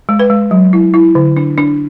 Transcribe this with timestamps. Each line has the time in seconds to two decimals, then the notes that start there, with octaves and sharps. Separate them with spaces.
0.09 G#3
0.19 B4
0.30 G#3
0.51 F#3
0.73 E4
0.94 E4
1.15 D3
1.37 D4
1.58 D4